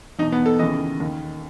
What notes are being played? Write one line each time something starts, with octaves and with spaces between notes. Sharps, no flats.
E2 B2 D#4
B3
A4
D#2 C#3 E3 D#5
D#2 D#3